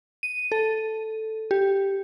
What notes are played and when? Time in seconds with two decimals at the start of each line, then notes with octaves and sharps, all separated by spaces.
0.23 D#7
0.52 A4
1.51 G4